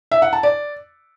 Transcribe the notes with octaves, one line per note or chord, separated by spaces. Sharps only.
E5
F#5
A5
D5